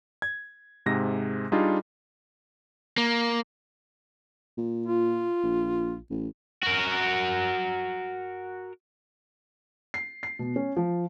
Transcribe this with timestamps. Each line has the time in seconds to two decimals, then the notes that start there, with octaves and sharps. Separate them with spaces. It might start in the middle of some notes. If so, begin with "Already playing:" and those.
0.22 G#6
0.86 G#2 C3 G#3 A#6
1.52 G3 D4 D#4 F4 G#4
2.98 A#3
4.58 A#2
4.86 F4
5.43 A#1
6.10 A1
6.63 F#4 A#4
9.94 C7
10.23 C7
10.39 B2
10.56 C#4
10.76 F3